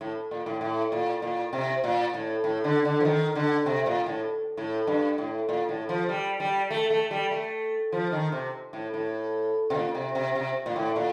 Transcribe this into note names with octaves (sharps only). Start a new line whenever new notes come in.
A2
A#2
A2
A2
A#2
A#2
C3
A#2
A2
A2
D3
D3
F3
D#3
D3
C3
A#2
A2
A2
G2
A2
A#2
A2
F3
G3
G3
A3
A3
G3
A3
F3
D#3
C3
A2
A2
C3
A#2
C3
C3
C3
A#2
A2
A#2